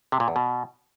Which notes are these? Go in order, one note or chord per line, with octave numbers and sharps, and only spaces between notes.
C3
A#2
E2
B2